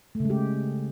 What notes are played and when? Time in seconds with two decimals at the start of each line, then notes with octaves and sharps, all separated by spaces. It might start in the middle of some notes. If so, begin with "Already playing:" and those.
0.15 A3
0.20 C#3
0.25 G#3
0.30 G4